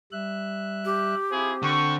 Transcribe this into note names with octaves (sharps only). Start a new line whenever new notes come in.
G3 E5 F#6
G4
C4 E4 F4 G#4
D3 G5 C#6